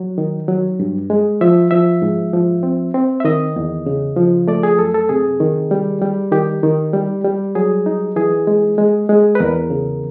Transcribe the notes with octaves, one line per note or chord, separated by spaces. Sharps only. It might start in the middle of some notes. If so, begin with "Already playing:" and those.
Already playing: F#3
D#3
F#3
G2
G#3
F3 E5
F3 E5
G#2
F3
C4
C4
E5
D#3 D#5
E2
C#3
F3
A3 D5
G#4
F#2 A4
A4
C3 G#4
D#3
G3
G3
D#3 G4
D#3
G3
G3
F#3 G#4
D#4
E3 G#4
G#3
G#3
G#3
B4
E2 A#4
C#3